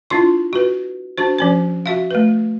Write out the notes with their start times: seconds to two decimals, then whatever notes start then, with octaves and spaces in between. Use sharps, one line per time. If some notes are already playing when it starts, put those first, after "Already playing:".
0.10 D4 E4 F4 C#6
0.53 F#4 B4
1.18 D4 F#4 C5
1.39 F3 C#4 C5
1.86 F#4 E5 F5
2.11 A3 B4